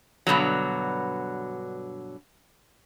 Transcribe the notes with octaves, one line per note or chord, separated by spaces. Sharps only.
G2 B2 D3 F#3